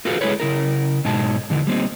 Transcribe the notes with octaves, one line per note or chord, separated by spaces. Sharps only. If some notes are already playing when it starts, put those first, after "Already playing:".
F4 F#4 G#4 A4 B4 F5
G#3 E4 G#4 A4 B4 C#5
C#3 E4 A#4
G#2 B2 G#3 D#4 A5
E2 D3 E3
G3 A#3 C4 D#4